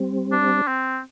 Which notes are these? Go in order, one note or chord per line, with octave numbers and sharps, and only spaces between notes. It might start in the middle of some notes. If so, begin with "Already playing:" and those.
Already playing: G3 C4
D4
C4